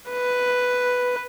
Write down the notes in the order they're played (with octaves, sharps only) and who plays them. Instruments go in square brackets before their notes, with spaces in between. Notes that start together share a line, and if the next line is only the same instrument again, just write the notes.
[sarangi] B4